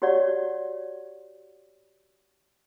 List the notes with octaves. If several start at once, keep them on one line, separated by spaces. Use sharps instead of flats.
F#4 G4 C#5 D5 F#5